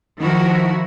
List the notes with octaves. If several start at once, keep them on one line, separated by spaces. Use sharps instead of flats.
D#3 F3 E4 F#4 A#4